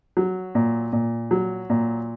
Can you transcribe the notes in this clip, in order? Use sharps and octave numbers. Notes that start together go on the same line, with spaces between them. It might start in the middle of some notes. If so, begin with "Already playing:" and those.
F#3
A#2
A#2
F#3
A#2